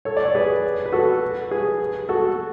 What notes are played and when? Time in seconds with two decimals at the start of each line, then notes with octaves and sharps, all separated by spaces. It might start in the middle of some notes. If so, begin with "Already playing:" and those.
0.05 A4 C#5
0.17 D5
0.25 C#5
0.35 G#4 B4
0.86 B4
0.93 F#4 A4
1.51 G#4 B4
2.09 F#4 A4